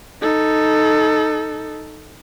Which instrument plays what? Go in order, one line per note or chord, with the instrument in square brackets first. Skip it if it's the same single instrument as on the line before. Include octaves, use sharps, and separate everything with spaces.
[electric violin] D#4 A4